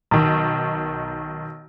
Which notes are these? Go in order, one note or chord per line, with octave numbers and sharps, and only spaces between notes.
B1 D#3